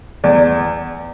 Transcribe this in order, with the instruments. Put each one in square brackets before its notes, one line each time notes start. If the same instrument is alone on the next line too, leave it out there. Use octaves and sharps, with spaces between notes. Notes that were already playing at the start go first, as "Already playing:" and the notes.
[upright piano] E2 D5